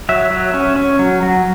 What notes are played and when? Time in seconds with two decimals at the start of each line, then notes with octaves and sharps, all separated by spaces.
0.09 F#3 E5
0.31 F#3
0.54 C#4
0.76 C#4
0.99 F#3
1.23 F#3